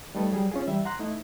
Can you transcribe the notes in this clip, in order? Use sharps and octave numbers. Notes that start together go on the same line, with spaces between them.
G3 A3 D#4 A4 B4
F#3 G3 G#4
C#4 F4 G#4
E3 G3 E5
F#5 A#5 C6 F#6
A3 D#4 E4